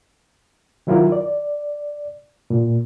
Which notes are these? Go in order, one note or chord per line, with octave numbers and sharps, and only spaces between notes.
D#3 F#3 E4 F4 A#4
D5
A#2